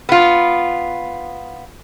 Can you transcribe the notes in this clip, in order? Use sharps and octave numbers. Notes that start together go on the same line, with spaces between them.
B3 F4